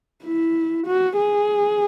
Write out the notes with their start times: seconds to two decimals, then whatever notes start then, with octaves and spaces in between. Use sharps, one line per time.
0.24 E4
0.86 F#4
1.17 G#4